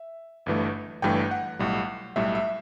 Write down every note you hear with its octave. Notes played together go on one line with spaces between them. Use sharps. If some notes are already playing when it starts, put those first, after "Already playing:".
Already playing: E5
G1 G2 E3 A3
G1 G2 E3 A3 G5
F#5
B1 A2 G3
B1 A2 G3 E5
E5